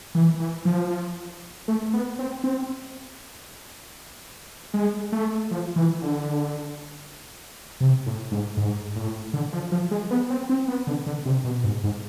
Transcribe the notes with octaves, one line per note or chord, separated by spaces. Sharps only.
E3
E3
F3
A3
B3
C4
C4
G#3
A3
F3
E3
D3
C3
A2
G#2
G#2
A2
D3
F3
F3
G#3
B3
C4
C4
B3
D3
D3
C3
B2
G#2
G#2